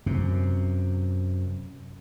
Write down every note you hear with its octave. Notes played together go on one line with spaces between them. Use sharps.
F#2 C3